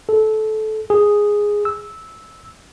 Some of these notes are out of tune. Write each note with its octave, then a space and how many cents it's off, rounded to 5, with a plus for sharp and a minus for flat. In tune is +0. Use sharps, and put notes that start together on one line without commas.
A4 -20
G#4 -5
E6 -10